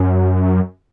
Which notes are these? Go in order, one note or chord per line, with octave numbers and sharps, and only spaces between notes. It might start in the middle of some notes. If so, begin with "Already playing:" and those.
Already playing: F#2